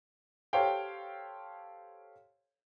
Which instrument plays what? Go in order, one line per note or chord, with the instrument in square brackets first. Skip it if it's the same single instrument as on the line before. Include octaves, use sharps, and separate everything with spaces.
[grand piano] G4 A4 C5 C#5 F5 G5